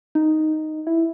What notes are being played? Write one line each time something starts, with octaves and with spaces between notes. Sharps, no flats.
D#4
E4